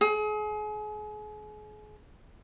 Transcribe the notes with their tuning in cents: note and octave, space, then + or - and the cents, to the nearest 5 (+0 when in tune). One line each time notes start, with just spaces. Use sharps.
G#4 +35